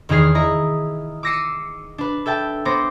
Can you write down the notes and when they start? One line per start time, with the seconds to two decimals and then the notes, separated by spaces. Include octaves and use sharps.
0.09 E2 D#3 D#4 G#4 F6 C7
0.35 E4 D#5 A#5
1.23 D6 E6 A#6 C7 C#7 D#7
1.98 D4 B4
2.26 A4 E5 G5 A5
2.65 B3 C5 D6 A#6